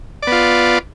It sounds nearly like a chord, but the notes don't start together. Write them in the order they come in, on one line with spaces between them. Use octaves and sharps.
D5 B3 F4